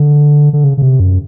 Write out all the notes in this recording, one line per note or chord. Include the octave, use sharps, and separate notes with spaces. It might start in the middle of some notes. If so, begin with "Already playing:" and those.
Already playing: D3
D3
C#3
C#3
C3
F#2